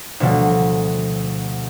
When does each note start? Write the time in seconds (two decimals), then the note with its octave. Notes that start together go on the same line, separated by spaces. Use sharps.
0.20 D2 B2 F3 G3